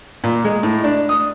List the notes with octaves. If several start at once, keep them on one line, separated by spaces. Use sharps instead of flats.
A#2
G#3
A2
D4
D#6